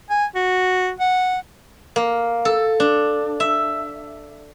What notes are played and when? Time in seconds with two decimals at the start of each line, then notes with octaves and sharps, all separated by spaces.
0.10 G#5
0.35 F#4
1.00 F#5
1.96 A#3
2.45 A4
2.80 D4
3.40 E5